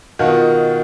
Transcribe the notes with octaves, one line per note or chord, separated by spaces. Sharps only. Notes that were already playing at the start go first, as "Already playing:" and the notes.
B2 D#3 F4 F#4